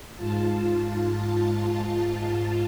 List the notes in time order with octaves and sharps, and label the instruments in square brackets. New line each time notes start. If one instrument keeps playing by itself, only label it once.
[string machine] G#2 F4 A5